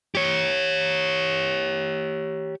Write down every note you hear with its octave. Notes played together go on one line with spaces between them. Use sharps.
G4 C#5